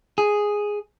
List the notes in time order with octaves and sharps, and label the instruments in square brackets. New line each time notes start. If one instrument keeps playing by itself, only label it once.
[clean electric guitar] G#4